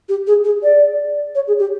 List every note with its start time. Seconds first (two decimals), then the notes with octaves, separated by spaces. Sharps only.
0.08 G4
0.26 G#4
0.44 G#4
0.63 D5
1.35 C#5
1.47 G#4
1.59 G4